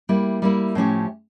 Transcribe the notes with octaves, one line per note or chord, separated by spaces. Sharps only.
G3 A#3 E4
G3 A#3 E4
A2 F3 C#4 G4